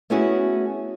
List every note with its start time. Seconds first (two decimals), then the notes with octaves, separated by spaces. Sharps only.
0.10 A3 B3 C#4 E4 F#4 G#4